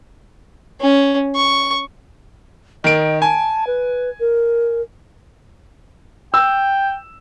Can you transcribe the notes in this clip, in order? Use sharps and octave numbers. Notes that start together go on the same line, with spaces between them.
C#4
C#6
D#3 D#5 D7
G#5 A5
B4
A#4
G5 E6